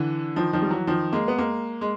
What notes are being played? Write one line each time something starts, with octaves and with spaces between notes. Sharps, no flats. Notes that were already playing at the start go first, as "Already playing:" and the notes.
Already playing: D3 E3
D#3 F3
D#3 F3
G3
E3 F#3
D#3 F3
G#3 A#3
B3
G#3 A#3
G#3